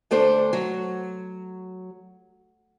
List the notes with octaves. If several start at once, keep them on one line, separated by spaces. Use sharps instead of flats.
D2 A3 D4 C5
F#3